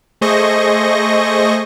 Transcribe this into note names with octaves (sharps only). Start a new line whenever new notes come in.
A3 G#4 C5 D#5 C#6 A#6